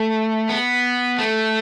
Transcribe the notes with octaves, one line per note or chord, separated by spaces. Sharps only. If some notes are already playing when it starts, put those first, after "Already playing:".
Already playing: A3
B3
A3